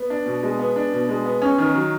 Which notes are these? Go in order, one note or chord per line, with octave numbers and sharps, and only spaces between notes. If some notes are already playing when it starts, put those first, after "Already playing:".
Already playing: B3
D4
B2
G#3
B3
D4
B2
G#3
B3
C#4
D#3
F#3